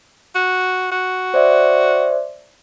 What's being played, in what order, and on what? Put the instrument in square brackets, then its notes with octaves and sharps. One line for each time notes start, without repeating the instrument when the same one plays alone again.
[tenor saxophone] F#4
F#4
[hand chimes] C5 D5 E5